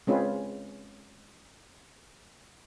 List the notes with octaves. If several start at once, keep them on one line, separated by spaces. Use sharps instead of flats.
G#3 C4 C#4 F4 B4